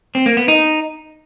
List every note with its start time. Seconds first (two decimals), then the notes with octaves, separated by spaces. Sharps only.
0.15 C4
0.26 A#3
0.37 B3
0.48 D#4